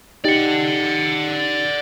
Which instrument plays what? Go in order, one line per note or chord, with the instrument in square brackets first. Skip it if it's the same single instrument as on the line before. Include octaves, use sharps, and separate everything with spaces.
[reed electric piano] D#4 G4 [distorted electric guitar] D5 F#5